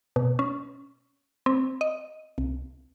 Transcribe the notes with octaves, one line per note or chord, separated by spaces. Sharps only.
B2
C#4
C4
D#5
C2